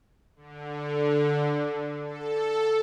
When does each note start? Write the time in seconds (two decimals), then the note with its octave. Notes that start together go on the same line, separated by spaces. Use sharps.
0.36 D3
2.04 A4